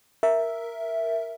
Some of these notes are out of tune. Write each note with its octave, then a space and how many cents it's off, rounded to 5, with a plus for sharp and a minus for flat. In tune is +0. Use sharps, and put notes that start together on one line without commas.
A#4 +0 E5 +0